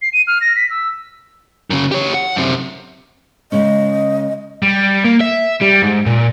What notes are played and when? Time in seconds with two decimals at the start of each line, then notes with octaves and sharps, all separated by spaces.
0.02 C7
0.13 D#7
0.27 F6
0.41 A#6
0.56 B6
0.70 E6
1.70 F#2 C#3
1.92 G4 C#5
2.14 F#5
2.36 F#2 C3
3.52 C#3 G#3 C#4 D#5
4.62 G3
5.05 A#3
5.21 E5
5.61 G3
5.82 G#2
6.06 A#2